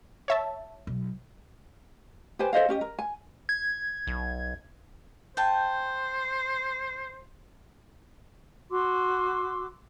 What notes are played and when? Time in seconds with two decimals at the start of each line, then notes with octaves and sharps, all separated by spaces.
0.28 C#5 E5 A5
0.87 B1
2.39 G4 B4 C5 G#5
2.53 A4 C5 D#5 F5
2.69 C#4 G4 D#5
2.81 A#4
2.99 G#5
3.49 G#6
4.07 B1
5.37 C5 G5 A5
8.71 F#4 C6 D6 E6